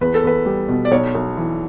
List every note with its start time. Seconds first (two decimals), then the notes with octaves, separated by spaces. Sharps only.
0.01 E2 B4
0.14 A4
0.23 E2 B4
0.46 G3
0.69 B2
0.85 D5
0.91 B1 C#5
1.15 B1
1.37 E3